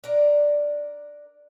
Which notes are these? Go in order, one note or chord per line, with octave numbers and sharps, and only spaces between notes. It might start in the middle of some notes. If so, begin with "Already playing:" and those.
D4 A#4 D5